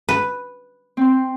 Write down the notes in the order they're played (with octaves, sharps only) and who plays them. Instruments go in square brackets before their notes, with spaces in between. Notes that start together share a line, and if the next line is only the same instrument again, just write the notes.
[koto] B4
[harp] C4 C6